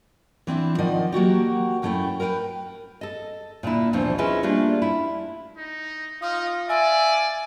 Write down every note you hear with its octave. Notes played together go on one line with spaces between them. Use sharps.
E3 C4 D4 E4
D#3 F3 D5 D#5 F#5
F#3 A#3 F#4 G4
F#2 F3 A3 C#4 E4 G5
A#4 B4 F5 G5
A4 D#5
A#2 D3 D4 E4
D2 B2 D3 E3 F3 C4
C#4 E4 F4 G#4 B4 D#5
G3 A3 A#3 D4 F4
E4
D#4
D#4 F4 D#6
D5 E5 G#5